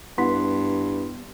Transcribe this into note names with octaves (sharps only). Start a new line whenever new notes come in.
G2 B3 E4 C6 B6